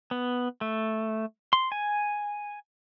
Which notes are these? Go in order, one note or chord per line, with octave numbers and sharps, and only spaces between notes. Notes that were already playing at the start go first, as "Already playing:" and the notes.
B3
A3
C6
G#5